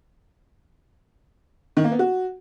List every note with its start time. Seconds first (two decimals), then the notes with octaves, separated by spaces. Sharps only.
1.77 D#3
1.84 A#3
1.92 B3
1.99 F#4